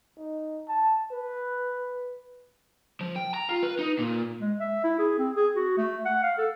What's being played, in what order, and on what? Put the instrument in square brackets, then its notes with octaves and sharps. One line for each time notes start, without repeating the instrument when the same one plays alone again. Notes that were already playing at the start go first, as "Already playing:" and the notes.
[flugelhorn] D#4
A5
B4
[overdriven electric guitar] F3
G5
A#5
F4
B4
D#4
A#2
[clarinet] G#3
E5
E4
G#4
C4
G#4
F#4
A3
F#5
F5
A4